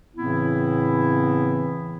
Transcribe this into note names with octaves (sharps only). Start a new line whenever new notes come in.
A2 C#3 E3 B3 C4 E4